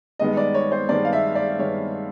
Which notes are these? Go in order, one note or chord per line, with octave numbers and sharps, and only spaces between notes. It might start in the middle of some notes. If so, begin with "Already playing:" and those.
G2 D#3 G#3 B3 D#5
D5
C#5
C5
G2 D#3 G#3 B3 D5
F5
E5
D5
G2 D#3 G#3 B3 C#5